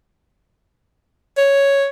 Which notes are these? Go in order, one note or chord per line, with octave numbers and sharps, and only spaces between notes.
C#5